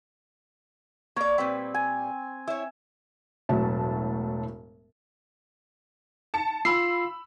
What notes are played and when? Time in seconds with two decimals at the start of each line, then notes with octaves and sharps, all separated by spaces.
1.16 A#3 C#5 D5
1.38 A#2 G3 C4 B4
1.74 G#5
2.47 E4 C#5 E5
3.49 E1 A2 F#3 E5 A5
6.34 A5 C#7
6.65 F4 B5 E6 C7